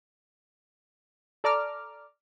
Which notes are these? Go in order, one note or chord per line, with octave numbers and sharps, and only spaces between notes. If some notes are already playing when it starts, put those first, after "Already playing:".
A4 D5 A#5 D6 F6